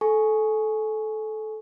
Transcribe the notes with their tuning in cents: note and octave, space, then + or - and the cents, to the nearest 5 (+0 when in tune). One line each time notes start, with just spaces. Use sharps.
A4 -20 G#5 +15 C#6 +0